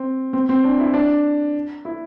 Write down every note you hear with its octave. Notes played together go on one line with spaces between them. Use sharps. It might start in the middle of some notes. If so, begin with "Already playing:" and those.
Already playing: C4
C4
C4
D4
E4
D4
E4